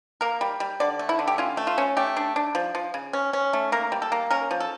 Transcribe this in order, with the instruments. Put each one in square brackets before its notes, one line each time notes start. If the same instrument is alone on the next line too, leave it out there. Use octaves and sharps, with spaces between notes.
[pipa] A#3 A#4
G3
G3
D3 D5
A3
E4
D3
G4
C#4 F4
A3
F4
C#4
A3 G4
D4
D4
F3
F3
C#3
C#4
C#4
A3
A#3 A#4
G3
A4
A#3
C#4 A#4
F3
A4